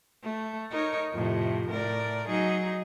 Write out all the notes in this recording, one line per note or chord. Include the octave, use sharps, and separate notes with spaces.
A3
D#4 A#4 C#5
F2 A2 C3
A2 A#4 D5
F#3 D#4 G#4